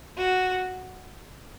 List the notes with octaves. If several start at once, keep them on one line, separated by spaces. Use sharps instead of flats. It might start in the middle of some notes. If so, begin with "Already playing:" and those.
F#4